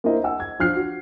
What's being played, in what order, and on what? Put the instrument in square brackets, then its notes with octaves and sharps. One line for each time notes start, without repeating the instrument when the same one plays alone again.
[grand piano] A#3 D4 E4 C5 D#5
D#5 F#5 G#5 E6
G#6
F3 D4 F6 F#6 C7
F#4